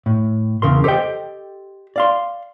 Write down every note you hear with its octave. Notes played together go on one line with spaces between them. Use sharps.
A2
E2 C#3 A#4 C6
G4 A4 C5 D#5 G5
D5 F5 C6